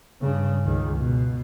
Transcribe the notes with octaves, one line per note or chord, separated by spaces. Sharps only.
G2 C#3
C#2 D#3
B2